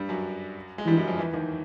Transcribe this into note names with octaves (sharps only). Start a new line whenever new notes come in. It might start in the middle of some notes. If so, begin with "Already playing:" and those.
Already playing: G2 G3
F#2 F#3
G#3
G2 E3 G3
F#2 F#3
F2 F3
E2 E3
D#2 D#3